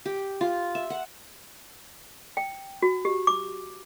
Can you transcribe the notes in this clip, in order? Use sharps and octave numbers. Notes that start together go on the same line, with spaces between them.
G4
F4
E5
F#5
G5
F#4
G4
D6